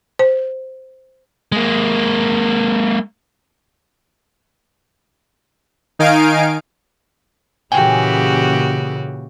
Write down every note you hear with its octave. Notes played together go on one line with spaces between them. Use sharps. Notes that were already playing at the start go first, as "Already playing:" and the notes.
C5
G#3 A#3
D#3 D#4 F5 G#5 D7
A#2 C#3 E3 F#4 G4 G5 G#5